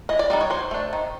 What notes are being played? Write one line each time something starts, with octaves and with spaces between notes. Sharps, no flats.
E3 D#5
D5
G3 B3 D#4 D5
C#5
F#3 C5
A3 D4
D#3